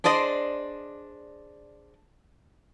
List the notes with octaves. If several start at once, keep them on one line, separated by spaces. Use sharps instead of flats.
D4 G#4 C5 D5 D#5